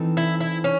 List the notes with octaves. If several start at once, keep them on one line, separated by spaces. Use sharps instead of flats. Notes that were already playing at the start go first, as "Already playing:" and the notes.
Already playing: E3 C4 D#4 A4
E4
E4
C#4